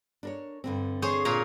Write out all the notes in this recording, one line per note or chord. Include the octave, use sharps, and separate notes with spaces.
D4 A#4 C#5
G2 D3 C4
G#4 C5 C#5
A#2 C#5 A#5